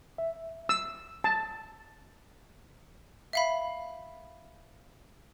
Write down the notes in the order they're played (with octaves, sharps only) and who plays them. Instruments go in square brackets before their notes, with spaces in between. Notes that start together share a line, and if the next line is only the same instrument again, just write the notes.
[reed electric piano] E5
[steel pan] E6
A5
[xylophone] E5 F5 B5